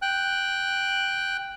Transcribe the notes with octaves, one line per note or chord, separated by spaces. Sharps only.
G5 F#6